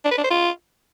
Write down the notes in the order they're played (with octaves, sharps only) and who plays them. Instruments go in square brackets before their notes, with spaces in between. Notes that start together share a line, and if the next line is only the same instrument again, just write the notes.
[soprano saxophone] D4
B4
D4
C5
F4